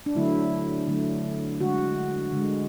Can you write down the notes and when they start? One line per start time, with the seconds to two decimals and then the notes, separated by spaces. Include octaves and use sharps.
0.06 D4
0.15 D3 F#3 A3 E4
0.87 D3 F#3 A3
1.60 D3 G#3 F#4
2.33 D3 G#3